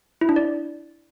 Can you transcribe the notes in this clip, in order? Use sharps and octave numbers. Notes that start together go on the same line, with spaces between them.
E4
D4
D5